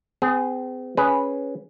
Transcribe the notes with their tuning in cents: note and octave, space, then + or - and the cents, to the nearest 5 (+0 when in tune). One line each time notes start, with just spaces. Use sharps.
C4 -40 G#4 +0
C#4 +0 G#4 +0 B4 -5